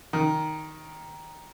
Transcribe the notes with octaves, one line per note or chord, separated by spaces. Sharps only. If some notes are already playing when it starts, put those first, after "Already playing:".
D#3